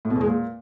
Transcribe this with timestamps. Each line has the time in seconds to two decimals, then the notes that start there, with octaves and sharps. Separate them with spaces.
0.05 A2
0.10 B2
0.15 E2
0.21 G#3
0.26 A#2